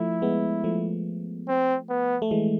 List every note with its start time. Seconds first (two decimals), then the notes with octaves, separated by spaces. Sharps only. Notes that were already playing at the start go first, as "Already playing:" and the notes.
Already playing: F3 A3 E4
0.22 G#3 B3
0.64 F3 A3
1.48 C4
1.89 B3
2.22 A3
2.31 E3 G#3